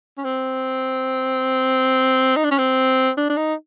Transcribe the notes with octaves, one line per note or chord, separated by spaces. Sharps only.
C#4
C4
D#4
D4
C#4
C4
D4
D4
D#4